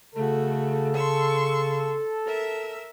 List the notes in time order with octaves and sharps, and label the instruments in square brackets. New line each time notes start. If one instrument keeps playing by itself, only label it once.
[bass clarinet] C#3 [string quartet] A3 F#4 [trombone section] A4
[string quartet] C6 C#6 E6
A#4 E5 E6